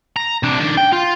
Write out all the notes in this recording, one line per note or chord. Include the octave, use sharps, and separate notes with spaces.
A#5
C3 D4
D#3 D4
G5
F4